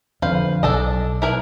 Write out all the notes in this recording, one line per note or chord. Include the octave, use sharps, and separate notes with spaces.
F2 D3 B4 C5 F5
B1 D4 A4 D#5
E4 A#4 B4